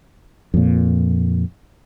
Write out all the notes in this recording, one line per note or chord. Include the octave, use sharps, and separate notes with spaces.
F2 A#2